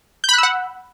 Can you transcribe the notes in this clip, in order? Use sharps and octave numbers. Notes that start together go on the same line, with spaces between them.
F#5 B5 E6 F#6 G6